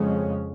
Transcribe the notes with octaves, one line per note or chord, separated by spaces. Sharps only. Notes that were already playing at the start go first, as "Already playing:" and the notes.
Already playing: F2 C#3 G#3 C#4